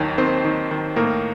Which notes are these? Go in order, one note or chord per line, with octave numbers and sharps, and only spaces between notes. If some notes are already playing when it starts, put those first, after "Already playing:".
Already playing: D#2 D#3 F#3 C#5
D#3 C4 C5
D#3
D#3
A2 A#3 A#4